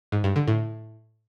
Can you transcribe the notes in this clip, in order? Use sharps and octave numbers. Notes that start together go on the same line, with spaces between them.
G#2
G2
D3
A2